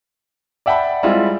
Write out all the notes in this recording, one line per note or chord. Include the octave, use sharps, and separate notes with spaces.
D5 E5 F#5 G5 A5 B5
G3 G#3 C4 E4 F4 G#4